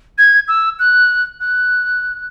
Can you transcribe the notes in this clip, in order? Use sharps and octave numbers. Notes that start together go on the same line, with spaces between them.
G#6
E6
F#6
F#6